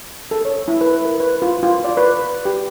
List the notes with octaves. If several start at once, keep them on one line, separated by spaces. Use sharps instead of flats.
A4
C#5
E4
B4
A#4
B4
F4
F4
D5
B4
G4